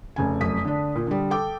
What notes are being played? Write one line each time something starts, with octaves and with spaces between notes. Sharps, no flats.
F1 C#3 G#5
F1 F#2 D#6 B6
D3 D4
A#2
D3 G3
A4 G5 D6